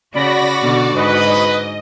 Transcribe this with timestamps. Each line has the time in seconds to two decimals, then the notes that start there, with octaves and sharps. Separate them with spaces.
0.14 C#3 F#4 D5 B5 A#6
0.61 B2 D3 D5
0.96 G#2 B4 D#5